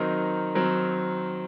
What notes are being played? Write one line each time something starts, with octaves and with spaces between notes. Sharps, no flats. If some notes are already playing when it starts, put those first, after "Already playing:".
Already playing: D#3 F#3 C4 D#4 A#4
D#3 F#3 C4 D#4 A#4